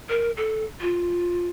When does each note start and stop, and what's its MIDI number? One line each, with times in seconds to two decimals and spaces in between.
0.09 0.31 70
0.37 0.65 69
0.81 1.48 65